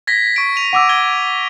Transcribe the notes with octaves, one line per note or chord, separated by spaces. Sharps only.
G#6 A#6 B6
C#6 D7
D#7 F7
F#5 D6 E6
G#6 G7